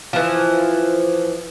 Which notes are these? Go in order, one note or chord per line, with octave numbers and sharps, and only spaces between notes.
E3 F3